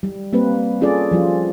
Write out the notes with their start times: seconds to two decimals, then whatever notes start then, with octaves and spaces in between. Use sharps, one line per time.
0.03 G3
0.33 G3 A#3 C4 B4
0.81 C#4 F4 G#4 A4 D5
1.11 F3 G3 F4